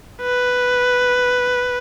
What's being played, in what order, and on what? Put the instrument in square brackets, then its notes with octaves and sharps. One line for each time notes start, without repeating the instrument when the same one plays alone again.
[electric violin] B4